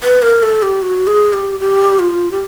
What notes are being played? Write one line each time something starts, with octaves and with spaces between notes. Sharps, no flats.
B4
A#4
A4
G4
F#4
G#4
G4
G4
F4
G4